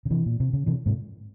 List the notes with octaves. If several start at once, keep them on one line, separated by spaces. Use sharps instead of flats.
C#3
C3 E3
A#2
C3
C#3
C3 E3
G#2 C3